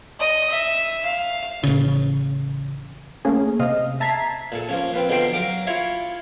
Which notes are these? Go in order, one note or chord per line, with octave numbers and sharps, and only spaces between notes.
D#5
E5
F5
A1 C#3
A3 A#3 C#4 G#4
C3 D#5 F5
E5 A5 A#5 G#6 B6 C7
A#2 A4
F3 A#3 C#4
C4 F4 B4
B2 D3 F3 A#4 G5 C6
F#3 A#4 F5 D6
E4 F4 C#5 F5